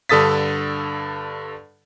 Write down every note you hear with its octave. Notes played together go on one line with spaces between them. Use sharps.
G2 D3 A4 D#6 A6 B6